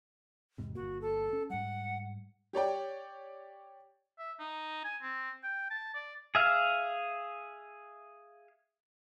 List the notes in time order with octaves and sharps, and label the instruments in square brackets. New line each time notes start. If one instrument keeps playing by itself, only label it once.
[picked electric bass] E2 G#2 C3
[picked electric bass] G1 A#3 [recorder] F#4
[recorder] A4
[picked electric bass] C#4
[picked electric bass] G#2 G3 [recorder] F#5
[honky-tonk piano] G4 C#5 D5 G5
[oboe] E5
D#4
G#5
C4
G5
A5
D5
[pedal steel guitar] G#4 E5 F5